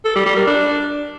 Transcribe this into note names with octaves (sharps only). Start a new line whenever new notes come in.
A4
G3
G3
A#4
D4